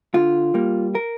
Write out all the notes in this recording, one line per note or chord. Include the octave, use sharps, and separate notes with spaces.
D3 F4
G3 A#3
A#4